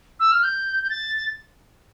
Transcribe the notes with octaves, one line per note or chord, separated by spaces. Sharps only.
E6
F6
G6
G6
A6